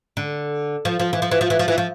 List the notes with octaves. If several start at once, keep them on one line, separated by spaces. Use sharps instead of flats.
D3
F3
F3
E3
F3
E3
F3
E3
F3
E3
F3